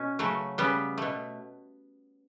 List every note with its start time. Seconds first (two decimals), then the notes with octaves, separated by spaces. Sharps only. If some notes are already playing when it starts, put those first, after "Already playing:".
Already playing: B2 C#4
0.19 C#3 F#3 A3
0.58 C#3 G3 B3
0.98 B2 A3